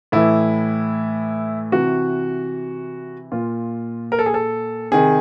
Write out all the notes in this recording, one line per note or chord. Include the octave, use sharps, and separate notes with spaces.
A2 E3 E4
C3 E3 F#4
A#2 F4
A#4
A4
G#4
A4
C3 D#3 G#4